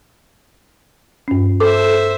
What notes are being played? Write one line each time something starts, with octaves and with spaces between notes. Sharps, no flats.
G2 C#4
A4 C5 E5 D6